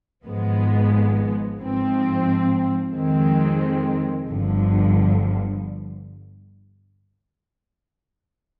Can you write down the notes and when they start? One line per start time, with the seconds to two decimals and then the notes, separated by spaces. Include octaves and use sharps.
0.24 G#1 G#2 F3 G#3 B3
1.58 G#2 F3 C4
2.94 F2 D#3 G#3 C4
4.28 G1 G2 D3 F3